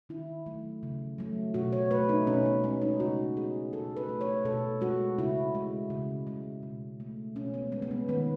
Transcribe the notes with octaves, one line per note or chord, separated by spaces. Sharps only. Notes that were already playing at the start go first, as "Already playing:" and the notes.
D#3 E4
F#3 A3
C#3
F#3 A3
B2 F#4
C#5
A3 B4
D#4
B2 C#4
B3
G#3 C#4
D#4
C#3 F#4
G#3 G#4
B2 A4
B4
A3
C#5
B2 A4
G#3 F#4
C#3 E4
G#3
C#3
G#3
B2
A3
B2 C#4
B3
G#3 B3
B3
C#4
D#3 B3